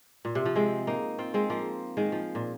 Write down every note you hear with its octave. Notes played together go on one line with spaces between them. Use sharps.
A#2
C3
F3
G#3 C4
A#3 D#4
C4 F4
G#3 C4
F3 A#3
D#3 G#3
F3
A#2